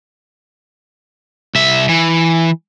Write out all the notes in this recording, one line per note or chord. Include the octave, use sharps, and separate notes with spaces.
C2 E5
E3